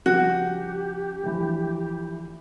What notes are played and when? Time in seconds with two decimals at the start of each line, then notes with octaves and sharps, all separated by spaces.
0.06 C#3 F3 G3 F#4 G4
1.24 D2 E3 F3